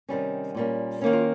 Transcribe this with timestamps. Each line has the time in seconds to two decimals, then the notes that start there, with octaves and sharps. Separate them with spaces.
0.09 C3 D#3 G3 C#4
0.55 A#2 G3 A#3 C#4
1.01 D#3 A#3 C#4 D#4
1.13 F4